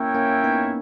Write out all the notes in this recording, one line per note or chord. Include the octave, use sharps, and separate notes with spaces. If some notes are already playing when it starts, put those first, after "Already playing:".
Already playing: A#3 C#4 E4 A#4 C#5 E5 G5
A#3 C#4
B3 D#4